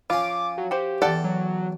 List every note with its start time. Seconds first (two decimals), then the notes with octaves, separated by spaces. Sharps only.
0.10 F3 C#4 F4 D6
0.58 F#3
0.71 F#4 G4 C5
1.02 E2 A4 D5 F#5 G5
1.24 F#3